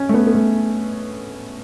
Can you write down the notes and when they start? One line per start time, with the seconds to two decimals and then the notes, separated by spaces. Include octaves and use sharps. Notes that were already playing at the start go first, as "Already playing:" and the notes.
Already playing: C#4
0.09 A3
0.14 B3
0.27 B3
0.35 A3